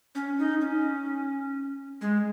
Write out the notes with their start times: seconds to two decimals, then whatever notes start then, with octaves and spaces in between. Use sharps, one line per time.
0.15 C#4
0.39 D#4
0.61 C#4
2.01 G#3